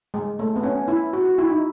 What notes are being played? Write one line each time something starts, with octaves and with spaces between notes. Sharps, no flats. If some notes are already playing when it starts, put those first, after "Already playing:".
G#3
A3
B3
C#4
E4
F#4
F#4
E4
D#4